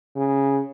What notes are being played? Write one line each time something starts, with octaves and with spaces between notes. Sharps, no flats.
C#3